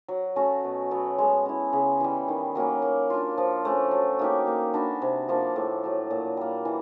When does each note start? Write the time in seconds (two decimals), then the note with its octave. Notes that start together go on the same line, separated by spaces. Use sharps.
0.08 F#3
0.36 A3 C#4 F#4
0.64 B2
0.91 F#3 B3
1.18 G#3
1.45 C#4 E4
1.73 C#3
2.00 E3 G3
2.28 D#3
2.55 F#3 A#3 C#4
2.82 A#3
3.10 D4 F4
3.38 F3
3.65 A3 C#4
3.91 F#3
4.19 A#3 D#4 G4
4.47 A#3
4.74 D4 F#4 B4
5.02 C3
5.28 F3 A#3 D4
5.56 A2
5.84 F#3 A3
6.11 A#2
6.37 G3 A#3
6.65 E3